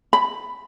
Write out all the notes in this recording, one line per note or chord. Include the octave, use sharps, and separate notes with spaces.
B5